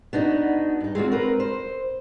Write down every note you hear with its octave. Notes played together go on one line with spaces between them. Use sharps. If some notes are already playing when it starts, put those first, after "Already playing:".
B3 D4 D#4 F#4
G2 D#4
G#3 C4 F4 F#4
C4 A#4 B4
C5